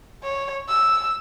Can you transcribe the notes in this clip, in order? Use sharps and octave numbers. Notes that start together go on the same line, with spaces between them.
C#5
E6